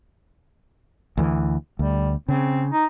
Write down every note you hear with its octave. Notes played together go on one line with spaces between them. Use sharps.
D2 E3
D2 G3
C#3 C4
D#4